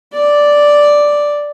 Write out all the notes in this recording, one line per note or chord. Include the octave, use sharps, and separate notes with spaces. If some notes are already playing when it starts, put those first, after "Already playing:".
D5